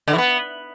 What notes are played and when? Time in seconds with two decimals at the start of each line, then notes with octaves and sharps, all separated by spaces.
0.08 D3
0.13 E3
0.18 B3